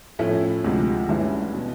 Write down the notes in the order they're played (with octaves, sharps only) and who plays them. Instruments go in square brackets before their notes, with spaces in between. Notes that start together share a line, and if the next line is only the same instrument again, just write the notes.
[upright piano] A2 F3 A3 C#4 E4
D2 C3 F3 G#3
G2 E3 G#3 C#4 E4
B2